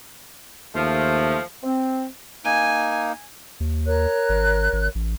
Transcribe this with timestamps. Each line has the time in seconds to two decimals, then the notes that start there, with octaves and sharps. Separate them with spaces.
0.75 D#2 F3 A3
1.64 C4
2.45 A#3 D#4 G#5
3.60 D#2
3.86 A#4 C#5 F#6
4.29 G#1
4.73 G#1
4.95 A1